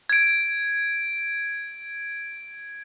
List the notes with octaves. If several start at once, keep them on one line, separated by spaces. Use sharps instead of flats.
G#6 D7